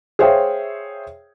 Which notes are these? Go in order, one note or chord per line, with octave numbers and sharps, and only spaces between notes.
G#4 C5 C#5 E5 F5 G5